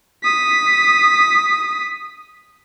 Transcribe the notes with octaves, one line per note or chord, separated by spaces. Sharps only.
D#6 B6